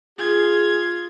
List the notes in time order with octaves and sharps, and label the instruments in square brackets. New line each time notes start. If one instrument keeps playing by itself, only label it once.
[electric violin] F4 G#6 [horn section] G#4